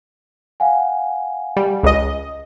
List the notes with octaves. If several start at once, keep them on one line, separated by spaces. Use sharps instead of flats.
F5 F#5 G#5
G3
C#2 D#5